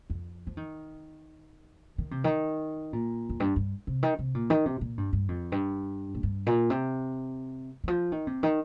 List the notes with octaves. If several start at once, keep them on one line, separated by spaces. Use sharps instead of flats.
F2
F3
D#3
D#3
C3
D#3
A#2
F2
G2
G2
C3
D#3
C3
A#2
D#3
C3
A#2
G2
G2
F2
G2
A#2
G2
A#2
C3
D#3
F3
D#3
C3
D#3